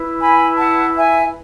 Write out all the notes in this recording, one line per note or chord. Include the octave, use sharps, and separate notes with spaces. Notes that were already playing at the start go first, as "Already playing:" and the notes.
Already playing: E4 B4
G#5 B5
F#5 A5
E5 G#5